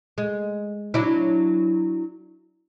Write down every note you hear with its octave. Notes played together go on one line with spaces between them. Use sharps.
G#3
F#3 D4 E4